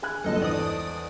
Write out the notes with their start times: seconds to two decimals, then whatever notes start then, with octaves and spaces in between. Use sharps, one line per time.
0.02 G#4 G#5 F#6
0.24 G1 C#2 F#2 A4 D#5 A5
0.42 E2 C5 D5 D#6